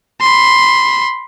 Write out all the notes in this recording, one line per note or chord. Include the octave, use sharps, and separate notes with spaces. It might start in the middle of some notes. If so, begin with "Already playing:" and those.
B5 C6